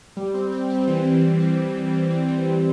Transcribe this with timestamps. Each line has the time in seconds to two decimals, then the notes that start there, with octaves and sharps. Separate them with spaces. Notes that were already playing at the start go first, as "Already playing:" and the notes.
0.17 G3
0.34 C4
0.52 C4
0.70 C4
0.87 E3
1.05 C4
1.23 E3
1.40 C4
1.58 E3
1.76 G3
1.93 C4
2.11 C4
2.28 G3
2.47 E3